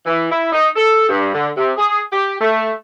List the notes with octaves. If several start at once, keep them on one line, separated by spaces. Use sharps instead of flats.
E3
E4
D#4
A4
G2
D3
C3
G#4
G4
A3